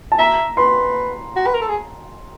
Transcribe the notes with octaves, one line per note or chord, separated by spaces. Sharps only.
A5
E5 A#5
B4 C6
F#4
B4
A#4
A4
G#4